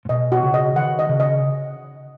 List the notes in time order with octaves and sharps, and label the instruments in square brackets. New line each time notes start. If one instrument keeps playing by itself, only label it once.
[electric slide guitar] G#2
[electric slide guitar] B2 [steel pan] D#5
[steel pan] F#4
[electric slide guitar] C#3
[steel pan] D#5
[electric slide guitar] D#3 [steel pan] F#5
[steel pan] D#5
[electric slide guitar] C#3
[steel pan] D#5